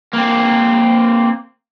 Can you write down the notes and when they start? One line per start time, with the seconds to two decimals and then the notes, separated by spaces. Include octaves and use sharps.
0.13 A#3 C4